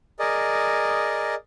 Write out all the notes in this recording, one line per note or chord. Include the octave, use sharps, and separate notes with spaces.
G#4 A#4 D5 D#5